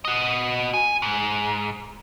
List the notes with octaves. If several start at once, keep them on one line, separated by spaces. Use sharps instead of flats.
F#4 D#5
G#5
G#2